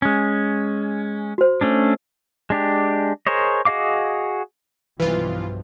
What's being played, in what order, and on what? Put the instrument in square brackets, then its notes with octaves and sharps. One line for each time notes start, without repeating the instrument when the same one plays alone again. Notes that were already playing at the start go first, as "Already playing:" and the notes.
[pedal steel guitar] G#3 C#4
[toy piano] F#4 C5
[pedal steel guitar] A3 C#4 D4
G#3 D4 G4
G#4 A#4 C5 C#5 D#5
F#4 G#4 D#5 F5 D6
[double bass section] B1 G2 F3 [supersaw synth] E3 F4 [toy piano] B4